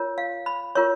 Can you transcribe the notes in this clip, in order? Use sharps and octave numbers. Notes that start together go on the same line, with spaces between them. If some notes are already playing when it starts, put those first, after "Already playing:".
Already playing: F4 A#4 C#5
F5
B5
F4 A#4 C#5 C#6